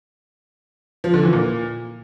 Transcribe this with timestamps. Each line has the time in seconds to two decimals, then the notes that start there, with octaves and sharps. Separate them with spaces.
1.04 F3
1.14 D3
1.23 E3
1.33 A#2